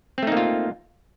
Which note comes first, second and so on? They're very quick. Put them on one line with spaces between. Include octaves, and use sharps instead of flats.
C4 A3 D#4 A#3 F4